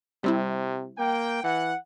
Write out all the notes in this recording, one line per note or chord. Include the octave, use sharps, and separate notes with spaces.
C3 G3 C4 E4
A#3 G5
E3 F#5